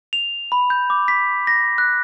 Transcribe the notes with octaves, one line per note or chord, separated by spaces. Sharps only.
F7
B5
G6
D6
B6
A#6
F#6